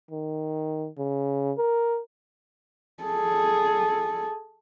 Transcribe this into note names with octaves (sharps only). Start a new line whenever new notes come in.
D#3
C#3
A#4
G#4 A4